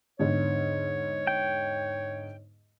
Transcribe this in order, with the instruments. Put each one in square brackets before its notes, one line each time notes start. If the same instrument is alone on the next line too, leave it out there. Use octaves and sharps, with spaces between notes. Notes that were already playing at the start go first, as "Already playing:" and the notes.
[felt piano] E2 G#2 D3 [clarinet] C#5
[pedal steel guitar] G5